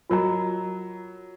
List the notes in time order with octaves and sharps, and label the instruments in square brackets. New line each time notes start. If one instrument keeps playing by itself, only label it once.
[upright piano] F#3 [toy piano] F4 A#4 D#5 A#5